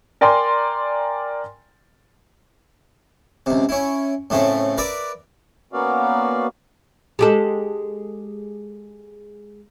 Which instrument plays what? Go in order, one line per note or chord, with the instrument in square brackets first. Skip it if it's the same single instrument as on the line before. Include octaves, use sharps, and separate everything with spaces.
[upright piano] A#4 D5 G5 G#5 A#5 C6
[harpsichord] C#2 C3
C#4 E4
A2 C#3 A3 C4
A#4 B4 D5 E5
[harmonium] A#3 B3 C#4 F#4 D5 F5
[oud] G#3 G4 A4